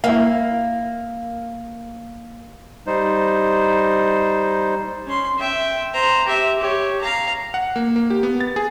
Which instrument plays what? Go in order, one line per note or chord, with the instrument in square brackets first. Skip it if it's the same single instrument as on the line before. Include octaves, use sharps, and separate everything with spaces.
[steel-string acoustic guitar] A#3 [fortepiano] E4 F5
[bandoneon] G3 D#4 C5
[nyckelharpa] C#4 C6
E5 G5
C5 A#5
G4 E5
G4 C#5
F5 A#5
[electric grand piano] F#5
A#3
A#3
G4
B3
A6
G#4